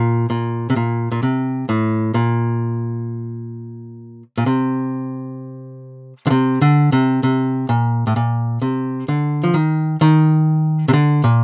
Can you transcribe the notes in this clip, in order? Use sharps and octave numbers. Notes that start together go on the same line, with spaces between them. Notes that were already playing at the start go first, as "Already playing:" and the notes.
Already playing: A#2
A#2
C3
A#2
A#2
C3
A2
A#2
A#2
C3
D3
C3
D3
C3
C3
A#2
A2
A#2
C3
D3
F3
D#3
D#3
C3
D3
A#2